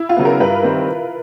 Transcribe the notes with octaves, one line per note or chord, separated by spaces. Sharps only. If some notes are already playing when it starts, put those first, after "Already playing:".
Already playing: E4
F4
C#3 F#3 B3
A#4
G2 B4
D#3 G3 C4